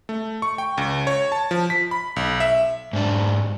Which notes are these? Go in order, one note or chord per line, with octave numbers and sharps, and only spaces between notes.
A3
C#6
G5
C#2
C#5
A5
F3
B6
B5
B1
E5
G#2 D4